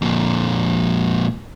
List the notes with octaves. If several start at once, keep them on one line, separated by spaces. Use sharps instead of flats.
F2 A#2